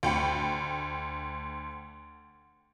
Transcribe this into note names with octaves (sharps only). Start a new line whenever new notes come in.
D2 G5 B5 C#7